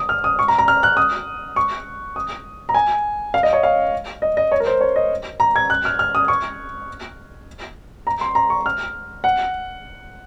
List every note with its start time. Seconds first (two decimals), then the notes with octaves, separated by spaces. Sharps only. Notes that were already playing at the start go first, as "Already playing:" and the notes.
Already playing: D#6
0.09 F6
0.24 D#6
0.39 C#6
0.48 A#5
0.59 A#5
0.68 F6
0.83 F#6
0.97 D#6
1.56 C#6
2.16 D#6
2.69 A#5
2.74 G#5
3.34 F5
3.43 D#5
3.53 C#5
3.63 F5
4.22 D#5
4.37 D#5
4.52 C#5
4.60 A#4
4.67 C5
4.81 C#5
4.96 D#5
5.40 A#5
5.56 G#6
5.70 F#6
5.85 F6
5.99 F6
6.15 D#6
6.28 C#6
8.07 A#5
8.21 C6
8.35 A#5
8.50 C#6
8.66 F6
9.24 F#5